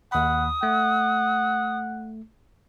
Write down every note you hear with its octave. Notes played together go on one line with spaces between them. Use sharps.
D#2 F#5 B5 D#6
A3 F#5